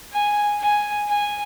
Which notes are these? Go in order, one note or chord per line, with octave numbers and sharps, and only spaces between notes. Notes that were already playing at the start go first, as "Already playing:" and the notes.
G#5
G#5
G#5